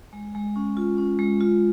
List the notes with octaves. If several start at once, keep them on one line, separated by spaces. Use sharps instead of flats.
G#3
G#3
C#4
F4
C#4
G#3
F4